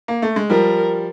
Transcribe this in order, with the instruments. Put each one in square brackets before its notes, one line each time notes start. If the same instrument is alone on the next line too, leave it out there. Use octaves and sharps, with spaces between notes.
[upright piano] A#3
A3
G#3
[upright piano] F3 G3 [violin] A#4